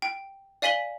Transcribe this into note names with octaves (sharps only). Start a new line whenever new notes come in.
G5
D5 F5 G#5 B6 F#7 G7